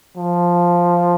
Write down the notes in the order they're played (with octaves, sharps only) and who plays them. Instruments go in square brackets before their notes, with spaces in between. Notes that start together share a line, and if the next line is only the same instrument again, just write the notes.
[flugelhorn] F3